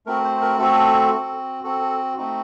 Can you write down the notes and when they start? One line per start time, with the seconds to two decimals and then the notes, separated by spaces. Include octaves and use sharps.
0.06 A3 C4 F#4 A#4
0.24 C5
0.41 A#4
0.59 A3 C4 F#4 A4
1.12 C4 F#4
1.64 C4 F#4 A4
1.82 A4
2.17 A3 C4 D#4 F#4